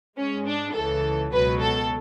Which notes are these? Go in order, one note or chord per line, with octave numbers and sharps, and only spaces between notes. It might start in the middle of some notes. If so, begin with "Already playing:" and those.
G#2 G#3 C#4
D4
C#2 C#3 E3 A4
C#2 B2 F#3 B4
A4